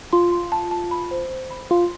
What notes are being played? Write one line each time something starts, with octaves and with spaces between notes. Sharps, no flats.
F4 C6
C6
A5
A5
B5
C5
C5
B5
F4 C6